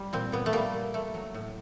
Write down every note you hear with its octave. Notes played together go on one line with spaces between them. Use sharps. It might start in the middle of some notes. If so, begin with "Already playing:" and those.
Already playing: G3
A#2 C4
A#2 B3
A3
G3 A#3
A#2
A3
F#3
A2